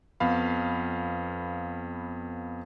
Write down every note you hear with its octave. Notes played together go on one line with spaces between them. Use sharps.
F2 B3 F5 B5